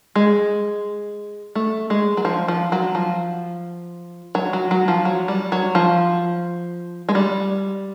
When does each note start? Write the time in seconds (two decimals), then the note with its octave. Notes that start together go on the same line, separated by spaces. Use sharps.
0.15 G#3
1.55 A3
1.90 G#3
2.17 F#3
2.25 F3
2.48 F3
2.72 F#3
2.95 F3
4.35 F#3
4.53 F#3
4.71 F#3
4.88 F3
5.05 F#3
5.28 G3
5.52 F#3
5.75 F3
7.09 G#3
7.15 G3